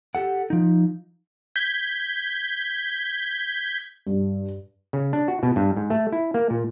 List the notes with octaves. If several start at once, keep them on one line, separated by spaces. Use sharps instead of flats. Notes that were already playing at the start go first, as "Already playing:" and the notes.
G4 A4 F#5
F3 D#4
G6 G#6 B6
G2
C#3
D4
F#4
B2
G2
G#2
A3
E4
A#3
A#2